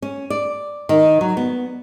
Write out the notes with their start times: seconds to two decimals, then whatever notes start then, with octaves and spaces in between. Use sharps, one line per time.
0.02 C#4
0.30 D5
0.89 D#3
1.21 F#3
1.37 B3